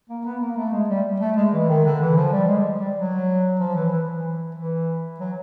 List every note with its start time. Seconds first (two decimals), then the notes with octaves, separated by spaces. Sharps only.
0.09 A#3
0.25 B3
0.41 A#3
0.57 A3
0.72 G#3
0.89 G3
1.20 A3
1.37 G#3
1.53 E3
1.68 D#3
1.84 D3
2.00 E3
2.16 F3
2.32 G3
2.48 G#3
2.80 G3
2.96 F#3
3.60 F3
3.75 E3
3.92 E3
4.08 E3
4.55 E3
5.20 F#3